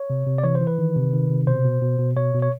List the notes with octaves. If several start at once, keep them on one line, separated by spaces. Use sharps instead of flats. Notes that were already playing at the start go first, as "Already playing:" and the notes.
Already playing: C#5
C3
C3
D5
E3 C#5
C5
E3
B4
D#3
C3
D#3
C3
B2 C5
B2
B2
B2
B2 C#5
B2
C#5